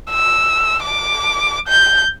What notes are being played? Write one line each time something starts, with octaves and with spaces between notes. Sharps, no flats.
E6
D6
G6